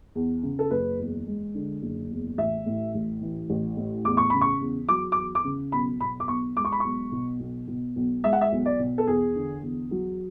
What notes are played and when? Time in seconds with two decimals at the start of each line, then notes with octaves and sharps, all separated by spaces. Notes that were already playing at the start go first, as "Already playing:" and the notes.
0.15 E2
0.43 C#3
0.59 A4
0.71 F#1 B4
0.98 E2
1.27 G#3
1.55 D3
1.82 F#1
2.10 E2
2.38 A1 E5
2.66 A2
2.95 A1
3.22 E3
3.50 A1
3.77 A2
4.05 E2 D6
4.17 C#6
4.30 C#3 B5
4.41 C#6
4.61 E2
4.89 F#3 D6
5.12 E2 D6
5.35 D6
5.44 C#3
5.72 B1 B5
6.00 B2 B5
6.20 D6
6.28 B1 C#6
6.56 G#3 D6
6.65 C#6
6.72 B5
6.80 B1 C#6
7.12 B2
7.40 B1
7.68 B2
7.96 B1
8.24 G#3 E5
8.33 F#5
8.41 E5
8.52 B1
8.66 D5
8.79 B2
8.98 A4
9.07 E2 G#4
9.35 D3
9.63 E2
9.91 F#3